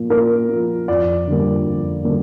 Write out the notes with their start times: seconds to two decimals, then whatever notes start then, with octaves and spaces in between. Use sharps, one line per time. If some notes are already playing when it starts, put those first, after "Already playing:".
Already playing: A#2 F3 A#3
0.10 A#2 A#4
0.49 F3 A#3
0.88 F2 D5
1.27 D3 G3 A#3
1.66 F2
2.04 D3 G3 A#3